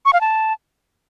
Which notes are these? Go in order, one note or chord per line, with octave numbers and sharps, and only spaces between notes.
C#6
F5
A5